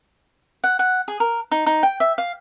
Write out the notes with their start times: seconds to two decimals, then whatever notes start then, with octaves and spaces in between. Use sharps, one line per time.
0.64 F#5
0.79 F#5
1.08 G#4
1.20 A#4
1.51 D#4
1.66 D#4
1.83 G5
2.00 E5
2.18 F5